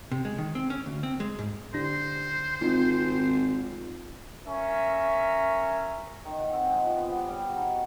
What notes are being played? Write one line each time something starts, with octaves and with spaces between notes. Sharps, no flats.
C3
G#3
D#3
C4
C#4
D2
C4
G#3
G#2
D3 G4 C5 A#6
G#1 C4 D#4 F4
C#4 A#4 E5
D#3
F#5
C4
G#3
F3
B3
G4
G3
F#4
D#4
C#6